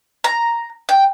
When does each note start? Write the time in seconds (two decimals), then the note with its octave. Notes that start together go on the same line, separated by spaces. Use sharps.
0.24 A#5
0.89 G5